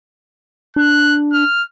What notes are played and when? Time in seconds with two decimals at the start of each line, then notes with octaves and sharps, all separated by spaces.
0.76 D4 F#6
1.32 F6